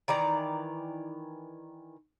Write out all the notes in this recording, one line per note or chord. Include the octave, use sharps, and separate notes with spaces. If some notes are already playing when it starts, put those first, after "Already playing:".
D#3 E3 D5 A#5